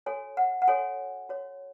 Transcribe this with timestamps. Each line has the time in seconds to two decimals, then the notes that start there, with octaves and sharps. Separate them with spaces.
0.06 F#4 A4 C#5 G#5
0.37 F#5
0.62 F#5
0.68 F#4 A4 C#5 G#5
1.29 F#4 C#5